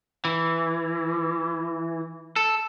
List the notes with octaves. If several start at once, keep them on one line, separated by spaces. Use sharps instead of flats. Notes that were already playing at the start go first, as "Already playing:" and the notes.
E3
A4